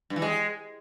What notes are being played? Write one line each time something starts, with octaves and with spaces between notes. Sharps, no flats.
G2
E3
G#3